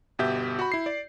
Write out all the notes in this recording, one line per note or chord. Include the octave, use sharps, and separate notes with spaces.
G1 B2 G4 E5 G6
F#4 B5
E4 C7
D5